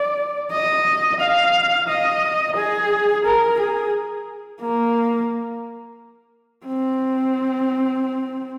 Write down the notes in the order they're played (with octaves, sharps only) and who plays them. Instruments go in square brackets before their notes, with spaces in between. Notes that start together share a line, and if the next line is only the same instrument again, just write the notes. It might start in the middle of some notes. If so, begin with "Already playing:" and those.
Already playing: [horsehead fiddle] D5
D#5
F5
D#5
G#4
A#4
G#4
A#3
C4